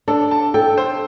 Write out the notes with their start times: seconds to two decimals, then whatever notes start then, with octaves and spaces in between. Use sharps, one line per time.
0.08 D4 A4
0.31 A5
0.54 A4 G5
0.78 C5